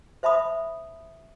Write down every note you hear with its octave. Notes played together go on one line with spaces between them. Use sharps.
C5 E5 A5 B5 D#6